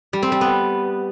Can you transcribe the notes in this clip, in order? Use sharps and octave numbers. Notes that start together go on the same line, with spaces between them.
G3
C4
G3
B3